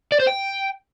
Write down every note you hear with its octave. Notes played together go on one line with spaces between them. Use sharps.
D5
C5
G5